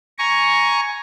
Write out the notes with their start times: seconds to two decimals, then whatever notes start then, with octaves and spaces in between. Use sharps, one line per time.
0.19 G#5 A#5 C#6